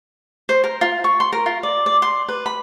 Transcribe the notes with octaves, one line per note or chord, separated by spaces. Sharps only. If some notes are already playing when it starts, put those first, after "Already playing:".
C5
A#4
F4
C#6
C6
A#4
F4
D5
D5
C6
B4
B5